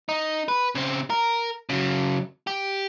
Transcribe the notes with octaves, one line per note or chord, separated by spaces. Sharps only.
D#4
B4
C#3 C4
A#4
C#3 F#3
G4